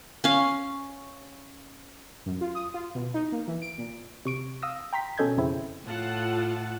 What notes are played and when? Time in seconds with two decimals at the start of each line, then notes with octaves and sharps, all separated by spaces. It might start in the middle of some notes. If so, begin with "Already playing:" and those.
0.24 C#4 F5
2.26 F#2
2.41 F4
2.55 D#6
2.74 F4
2.95 B2
3.14 D#4
3.32 A#3
3.47 E3
3.62 D7
3.78 A#2
4.25 C3 C#6 D7
4.62 F5 D#6 E6 A#6
4.93 G5 A#5 C6 B6
5.18 B2 C#4 A4 D#5 G6 G#6
5.37 F2 C#3 C4 E4
5.87 A2 F4 F#5 A5